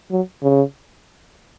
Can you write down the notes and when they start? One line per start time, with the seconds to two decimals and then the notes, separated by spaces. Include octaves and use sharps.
0.11 F#3
0.43 C#3